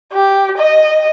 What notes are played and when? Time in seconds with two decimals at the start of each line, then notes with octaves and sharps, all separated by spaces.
0.13 G4
0.58 D#5